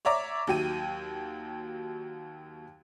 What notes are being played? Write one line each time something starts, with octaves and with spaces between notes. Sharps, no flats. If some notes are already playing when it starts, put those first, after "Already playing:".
C#5 D5 E5 A#5 D6
D#2 F#3 G5 D#7